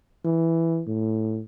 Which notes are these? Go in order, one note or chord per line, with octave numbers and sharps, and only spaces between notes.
E3
A2